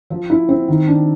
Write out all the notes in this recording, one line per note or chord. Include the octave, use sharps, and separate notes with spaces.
F3
E4
C4
D#3
D4